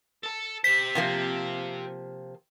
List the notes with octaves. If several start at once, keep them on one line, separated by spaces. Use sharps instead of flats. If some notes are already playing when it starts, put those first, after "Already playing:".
A4 A5
G4 C5 B6
C3 F3 A#3